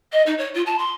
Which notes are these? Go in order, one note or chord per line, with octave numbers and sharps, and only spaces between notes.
D#5
D#4
C#5
F4
A5
C6